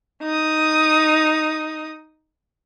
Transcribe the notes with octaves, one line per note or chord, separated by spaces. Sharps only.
D#4 D#6